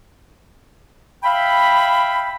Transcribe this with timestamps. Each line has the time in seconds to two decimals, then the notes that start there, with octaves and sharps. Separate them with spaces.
1.24 E5 F5 G5 B5